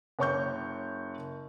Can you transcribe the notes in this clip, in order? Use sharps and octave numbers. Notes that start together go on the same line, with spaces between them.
F#1 C#5 C#6 G6